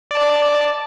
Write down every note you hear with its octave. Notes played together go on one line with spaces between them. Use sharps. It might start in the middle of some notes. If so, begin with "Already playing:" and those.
D5 A5